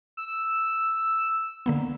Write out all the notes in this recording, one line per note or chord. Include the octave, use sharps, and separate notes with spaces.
E6
D3 A#3 B3